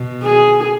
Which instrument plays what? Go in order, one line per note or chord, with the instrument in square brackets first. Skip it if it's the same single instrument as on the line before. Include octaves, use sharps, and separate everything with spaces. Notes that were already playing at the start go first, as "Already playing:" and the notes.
Already playing: [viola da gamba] B2
[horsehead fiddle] G#4